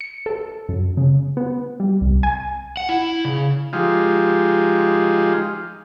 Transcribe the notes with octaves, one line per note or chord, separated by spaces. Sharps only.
C#7
A4
F#2
C#3
B3
G3
C2
G#5
F#5
E4
C#3
F3 G#3 D#4 F4 G4